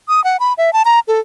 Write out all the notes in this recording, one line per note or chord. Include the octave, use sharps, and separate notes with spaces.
D#6
F#5
B5
E5
A5
A#5
A4